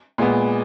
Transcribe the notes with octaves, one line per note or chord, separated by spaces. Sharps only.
A#2 G#3 B3